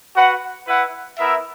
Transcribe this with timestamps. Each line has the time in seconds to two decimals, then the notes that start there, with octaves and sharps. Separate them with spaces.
0.14 F#4 B4 F#5
0.66 E4 B4 F#5
1.17 B3 E4 A#4 E5